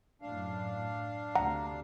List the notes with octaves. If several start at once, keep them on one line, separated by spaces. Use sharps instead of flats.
F#2 A2 D4 F5
D2 C3 F#5 A#5